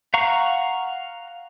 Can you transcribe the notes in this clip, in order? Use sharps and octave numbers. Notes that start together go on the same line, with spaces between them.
F5 F#5 A#5 C#6